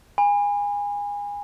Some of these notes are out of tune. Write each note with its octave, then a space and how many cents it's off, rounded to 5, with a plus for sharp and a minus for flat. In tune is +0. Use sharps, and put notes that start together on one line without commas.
G#5 -25 B5 +0